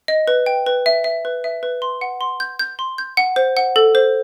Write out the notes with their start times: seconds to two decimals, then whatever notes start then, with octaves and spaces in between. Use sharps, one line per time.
0.08 D#5
0.28 B4
0.46 G5
0.66 B4
0.86 E5
1.04 E5
1.25 B4
1.44 E5
1.63 B4
1.82 C6
2.01 F#5
2.21 C6
2.40 G6
2.59 G6
2.79 C6
2.98 G6
3.17 F#5
3.36 C5
3.57 F#5
3.76 A4
3.95 C5